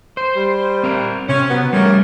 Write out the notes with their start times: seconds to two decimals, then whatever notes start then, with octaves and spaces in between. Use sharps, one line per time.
0.17 C5
0.36 G3
0.83 C4 A#4
1.29 C3 C#4
1.50 F#3 B3
1.73 G3 A3 C#4 A#4